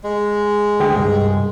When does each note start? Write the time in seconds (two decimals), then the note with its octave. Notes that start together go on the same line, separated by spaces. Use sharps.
0.04 G#3
0.80 D2 G#4 G5
0.97 C2 G2